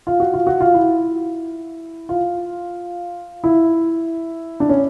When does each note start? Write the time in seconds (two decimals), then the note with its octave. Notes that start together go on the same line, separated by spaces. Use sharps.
0.07 F4
0.20 F#4
0.33 F4
0.47 F#4
0.61 F4
0.74 E4
2.09 F4
3.44 E4
4.60 D4
4.69 C#4